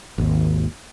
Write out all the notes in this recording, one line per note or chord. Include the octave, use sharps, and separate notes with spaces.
G#1 D#2